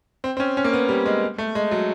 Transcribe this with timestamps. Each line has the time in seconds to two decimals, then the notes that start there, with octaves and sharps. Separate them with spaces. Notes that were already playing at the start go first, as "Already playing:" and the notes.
0.24 C4
0.37 C4
0.40 C#4
0.57 C#4
0.65 A#3
0.73 B3
0.89 G3
1.06 G#3
1.38 A3
1.55 G#3
1.71 F#3